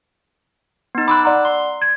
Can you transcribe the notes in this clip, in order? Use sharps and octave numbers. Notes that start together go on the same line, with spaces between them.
B3 D#4
B5 C6 D6 E6 F#6
D5 F#5 A#5
C6
G#6